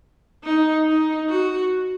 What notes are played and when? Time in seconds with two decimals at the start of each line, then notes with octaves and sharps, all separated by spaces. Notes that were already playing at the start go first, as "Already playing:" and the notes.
0.44 D#4
0.86 D#4
1.29 F#4